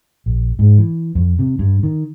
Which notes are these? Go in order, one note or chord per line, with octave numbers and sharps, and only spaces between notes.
A#1
G#2
E3
F2
C3
G2
D#3